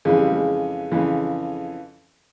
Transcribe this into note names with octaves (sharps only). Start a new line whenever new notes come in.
F2 C#3 E3 G#3
G3
G#3
F2 C#3 E3